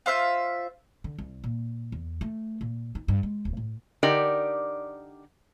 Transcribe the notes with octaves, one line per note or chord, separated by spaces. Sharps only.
F4 C5 E5 F5
D3
C2
A#2
E2
A3
A#2
D#4
G2
G#3
D1
A2
D3 D#4 G4 A#4 D5